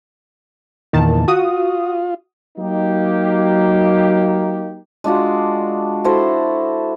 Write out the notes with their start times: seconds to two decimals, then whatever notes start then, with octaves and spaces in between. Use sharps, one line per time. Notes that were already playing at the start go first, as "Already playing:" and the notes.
0.93 E2 A#2 D#3 A5
1.28 F4 F#4 D#6
2.58 F#3 A#3 D#4 G4
5.04 G#3 D4 F4 F#4
6.04 E4 F#4 A4 C5